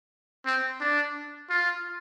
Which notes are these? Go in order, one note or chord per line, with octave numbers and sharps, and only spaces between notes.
C4
D4
F4